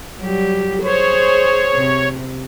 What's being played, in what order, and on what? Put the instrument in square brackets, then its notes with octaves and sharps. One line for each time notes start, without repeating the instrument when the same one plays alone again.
[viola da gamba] F#3 G3 G4
[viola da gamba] G#4 C5 [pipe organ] C#5
[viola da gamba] C3